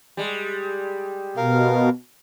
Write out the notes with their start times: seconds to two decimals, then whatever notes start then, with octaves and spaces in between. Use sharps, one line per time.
0.17 G3 G#3
1.37 B2 A#4 F5